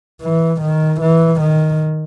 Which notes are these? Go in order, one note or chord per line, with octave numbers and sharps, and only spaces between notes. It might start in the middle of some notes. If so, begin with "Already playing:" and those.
E3
D#3
E3
D#3